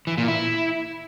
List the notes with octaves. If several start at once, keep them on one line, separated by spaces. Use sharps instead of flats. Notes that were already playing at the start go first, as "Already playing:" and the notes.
E3
A#2
E4